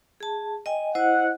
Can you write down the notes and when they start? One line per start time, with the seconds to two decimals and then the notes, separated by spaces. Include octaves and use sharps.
0.20 G#4 A5
0.66 D#5 G5 G#5
0.95 E4 C5 D#5 F#5